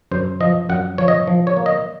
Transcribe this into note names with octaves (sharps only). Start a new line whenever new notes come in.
F#2 C5
F3 D#5
F#2 F#5
F3 C#5
D#5
F3
C#5
A#3
D#5